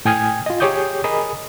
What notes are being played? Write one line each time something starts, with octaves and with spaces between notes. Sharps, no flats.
A2 G5 G#5 D#6 F6 G#6
F4 D#5
G4 G#4 C#5 D6 D#6 G6
G#4 A#4 D#5 B5 D#6